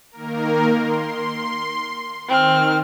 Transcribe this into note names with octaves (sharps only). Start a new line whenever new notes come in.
D#3 A#3 A#4
C6
D#3 C4 F6